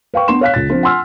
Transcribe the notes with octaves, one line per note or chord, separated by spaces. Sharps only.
B4 F5 G5 C#6
B3 D4 C6 E7
C#5 F5 F#6 B6
C#2 A6
F3 C4 D4 F4
F#5 G#5 C6 E6 F6